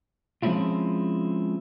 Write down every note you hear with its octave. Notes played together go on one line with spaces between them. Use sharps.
F3 G#3 C4 C#4 E4 F4